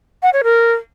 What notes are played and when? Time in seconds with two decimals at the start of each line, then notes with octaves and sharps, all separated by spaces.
0.23 F#5
0.33 C#5
0.44 A#4